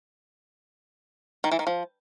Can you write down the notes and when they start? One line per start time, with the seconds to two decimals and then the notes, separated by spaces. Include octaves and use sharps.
1.44 D#3
1.52 E3
1.59 D#3
1.67 F3